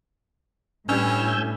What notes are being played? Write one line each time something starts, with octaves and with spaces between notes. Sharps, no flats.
A2 G3 C#4 D4 B4 G#5 E6 G6